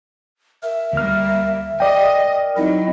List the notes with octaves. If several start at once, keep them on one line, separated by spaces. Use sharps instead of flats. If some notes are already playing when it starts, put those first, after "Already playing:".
A#4 E5
D2 G3 A#3 F6
D5 D#5 G5
F#3 C4 D#4 E4 D#5